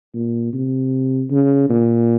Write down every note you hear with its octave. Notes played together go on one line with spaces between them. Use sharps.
A#2
C3
C#3
A#2